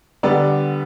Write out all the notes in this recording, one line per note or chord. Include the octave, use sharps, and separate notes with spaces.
D3 G3 B3 D5